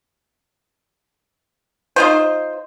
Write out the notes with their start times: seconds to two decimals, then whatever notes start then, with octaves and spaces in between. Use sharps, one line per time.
1.96 D#4 F4 C5